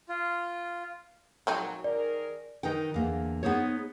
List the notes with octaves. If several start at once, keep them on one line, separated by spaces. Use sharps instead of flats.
F4
A#2 F3 F#3 G#3 C4 D#4
D#3 G#4 A#4 D5
D#3 D#4 B4 G5
E2 D3 A#3
B3 D#4 G#4 C5 C#5